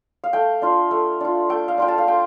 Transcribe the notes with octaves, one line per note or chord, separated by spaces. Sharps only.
F5
A3 G5
D4 F4
A3
D4 F4
A3 G5
F5
D4 F4 G5
A5
F5
A3 G5